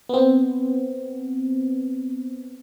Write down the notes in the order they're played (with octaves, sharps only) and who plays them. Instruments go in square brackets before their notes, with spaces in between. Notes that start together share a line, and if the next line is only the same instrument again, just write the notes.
[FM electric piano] B3 C4